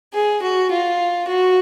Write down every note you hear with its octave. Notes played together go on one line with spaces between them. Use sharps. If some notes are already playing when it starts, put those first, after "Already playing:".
G#4
F#4
F4
F#4